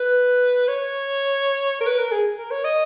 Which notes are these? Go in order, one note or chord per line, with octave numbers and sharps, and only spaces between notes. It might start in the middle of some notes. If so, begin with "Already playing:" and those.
Already playing: B4
C#5
A#4
B4
A#4
G#4
A#4
C#5
D#5